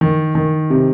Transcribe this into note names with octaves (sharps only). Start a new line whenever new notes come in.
D#3
D#3
C3